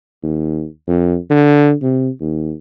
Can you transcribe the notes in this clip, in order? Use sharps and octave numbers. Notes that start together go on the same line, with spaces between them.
D#2
F2
D3
C3
D#2